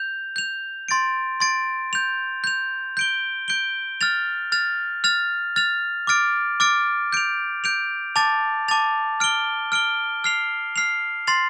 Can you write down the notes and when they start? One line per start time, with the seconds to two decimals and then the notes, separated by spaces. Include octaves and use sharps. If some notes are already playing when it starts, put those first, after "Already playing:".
Already playing: G6 F7
0.36 G6 F7
0.88 C6 A6 D7
1.40 C6 A6 D7
1.93 G6 F7
2.44 G6 F7
2.97 G6 D7 G7
3.48 G6 D7 G7
4.01 F6 A6 F7
4.52 F6 A6 F7
5.04 F6 A6 F7
5.56 F6 A6 F7
6.07 D6 F6 A6 D7
6.60 D6 F6 A6 D7
7.13 G6 D7 F7
7.64 G6 D7 F7
8.16 A5 D6 A6 F7
8.68 A5 D6 A6 F7
9.20 F6 D7 G7
9.72 F6 D7 G7
10.24 F6 C7 F7
10.76 F6 C7 F7
11.27 C6 A6 C7 F7